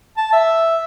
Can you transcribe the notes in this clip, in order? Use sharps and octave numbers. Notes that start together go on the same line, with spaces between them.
A5
E5